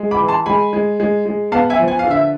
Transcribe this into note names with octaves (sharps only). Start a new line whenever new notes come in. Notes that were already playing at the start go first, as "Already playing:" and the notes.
Already playing: G#3
B5 D6
E3
A5 C6
G#3 G#5 B5
G#3
G#3
G#3
B3 F5 A5
E5 G#5
F3
G#5
F5
D3
E5